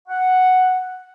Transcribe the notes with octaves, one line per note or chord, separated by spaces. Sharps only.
F#5